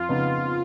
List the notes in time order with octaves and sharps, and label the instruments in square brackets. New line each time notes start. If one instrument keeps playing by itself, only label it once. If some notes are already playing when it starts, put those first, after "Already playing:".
Already playing: [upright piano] F2 [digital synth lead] F4
[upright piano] C#3 F3 B3 D#4